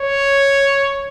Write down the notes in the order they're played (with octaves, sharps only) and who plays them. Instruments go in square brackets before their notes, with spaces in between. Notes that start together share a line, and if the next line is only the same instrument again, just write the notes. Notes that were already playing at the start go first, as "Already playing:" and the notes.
Already playing: [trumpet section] C#5